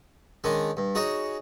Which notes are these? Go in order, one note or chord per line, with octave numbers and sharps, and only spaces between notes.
D#3 G#3 C#4 D4
G2
D#4 F#4 G#4 C#5